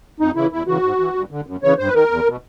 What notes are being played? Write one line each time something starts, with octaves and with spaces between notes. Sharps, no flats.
F2 D#4
C#3 E3 E4
E2 E4
C#3 E3 F#4
G#2
E3
G2
D3
F#2
C#3 E3 C#5
G2 C5
B4
D#3 A#4
E2
B2